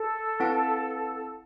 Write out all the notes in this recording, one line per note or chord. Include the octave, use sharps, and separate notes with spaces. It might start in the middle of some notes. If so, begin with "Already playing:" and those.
Already playing: A4
C4 E4 B4 F#5 A5